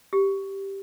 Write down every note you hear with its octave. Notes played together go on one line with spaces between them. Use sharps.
G4